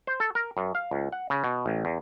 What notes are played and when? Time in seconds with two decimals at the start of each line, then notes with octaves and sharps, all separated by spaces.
0.07 C5
0.20 A4
0.35 A#4
0.57 F#2
0.75 F5
0.91 C#2
1.12 F#5
1.30 C#3
1.44 B2
1.66 A1
1.85 E2